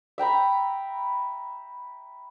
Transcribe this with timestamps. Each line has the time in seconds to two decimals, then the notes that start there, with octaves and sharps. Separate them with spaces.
0.18 E5 G5 A#5 B5